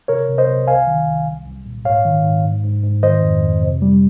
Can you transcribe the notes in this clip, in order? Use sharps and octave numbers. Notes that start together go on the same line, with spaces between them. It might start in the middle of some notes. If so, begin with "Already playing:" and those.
C3 A#4 C#5
C3
C5 D#5
C3
C2 F5 G#5
D#3
C2
C2
C2
A#2
G#2 C#5 F5
D#3
G#2
G#2
G#2
G#2
D#3 C5 D#5
F2
F2
C3
G3